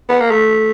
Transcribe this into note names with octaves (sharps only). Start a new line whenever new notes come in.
B3
A#3
A3